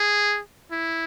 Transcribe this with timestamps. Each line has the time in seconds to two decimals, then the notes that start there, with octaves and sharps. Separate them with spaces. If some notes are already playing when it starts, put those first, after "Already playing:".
Already playing: G#4
0.71 E4